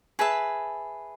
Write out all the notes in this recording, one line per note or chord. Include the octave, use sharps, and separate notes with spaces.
G#4 B4 E5 A5